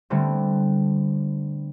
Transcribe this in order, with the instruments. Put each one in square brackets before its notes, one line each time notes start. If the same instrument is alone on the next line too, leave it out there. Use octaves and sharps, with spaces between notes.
[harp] D3 G3 A3 B3 C4